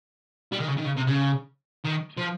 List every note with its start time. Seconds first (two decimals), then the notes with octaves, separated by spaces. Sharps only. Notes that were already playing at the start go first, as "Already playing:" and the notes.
0.52 G3
0.60 D#3
0.68 C#3
0.77 D#3
0.85 C#3
0.96 C3
1.07 C#3
1.85 D#3
2.17 F3